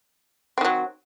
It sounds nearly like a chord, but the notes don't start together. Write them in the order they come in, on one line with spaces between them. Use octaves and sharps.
C4 D#3 F#3